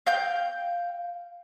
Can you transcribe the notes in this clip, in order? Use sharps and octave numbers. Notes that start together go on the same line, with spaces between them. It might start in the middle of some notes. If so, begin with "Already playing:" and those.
F5 G5 G6